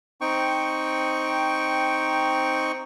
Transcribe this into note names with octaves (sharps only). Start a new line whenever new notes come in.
C4 D#4 G5 C#6